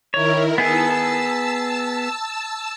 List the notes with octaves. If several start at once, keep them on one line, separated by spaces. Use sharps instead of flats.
D#3 E4 A#4 C#5
B3 G#4 A5 E6